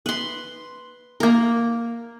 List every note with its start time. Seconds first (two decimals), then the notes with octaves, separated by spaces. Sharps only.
0.06 B4 C6
1.20 A#3 A#4